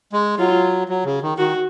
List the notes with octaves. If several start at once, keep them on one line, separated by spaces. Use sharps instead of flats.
G#3
F#3 F4
F#3
C#3
D#3
D#3 F#4